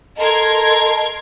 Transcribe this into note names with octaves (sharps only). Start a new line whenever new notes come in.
A4 A#4 D#5 A5 C6 G#6